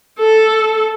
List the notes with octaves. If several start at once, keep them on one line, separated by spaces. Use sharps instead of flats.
A4